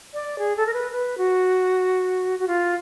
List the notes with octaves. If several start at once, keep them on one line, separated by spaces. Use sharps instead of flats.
D5
G#4
A4
A#4
B4
B4
F#4
F#4
F4